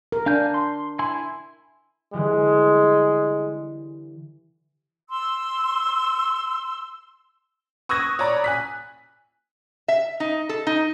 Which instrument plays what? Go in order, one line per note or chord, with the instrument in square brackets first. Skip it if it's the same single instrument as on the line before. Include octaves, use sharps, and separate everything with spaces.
[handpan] A#4
[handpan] D4 [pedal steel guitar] F5 G#5 G6
[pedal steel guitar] C6
E4 G#5 C6
[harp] D3 E3 G3 [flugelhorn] G#3
[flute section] C6 E6
[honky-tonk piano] C#6 D#6 E6 F#6 G#6 A#6
C#5 D5 A#5 B5
G#5 F#6 B6
[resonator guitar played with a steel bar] E5
D#4
A4
D#4